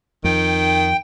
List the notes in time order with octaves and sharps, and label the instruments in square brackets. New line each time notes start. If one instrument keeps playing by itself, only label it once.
[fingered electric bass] F2 [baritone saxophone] D#3 [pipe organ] G5